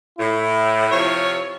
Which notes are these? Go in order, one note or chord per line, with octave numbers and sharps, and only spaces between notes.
A2 E4
C3 F3 C#5